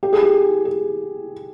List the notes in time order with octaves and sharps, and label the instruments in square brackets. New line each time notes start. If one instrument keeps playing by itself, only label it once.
[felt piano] G4
G#4
G4
G#4